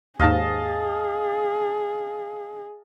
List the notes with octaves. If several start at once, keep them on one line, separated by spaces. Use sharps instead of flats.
D#2 G#2 G#4 D#5 F5 A5